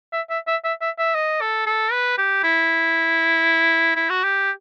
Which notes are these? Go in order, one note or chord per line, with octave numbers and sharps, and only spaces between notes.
E5
E5
E5
E5
E5
E5
D#5
A4
A4
B4
G4
E4
E4
F#4
G4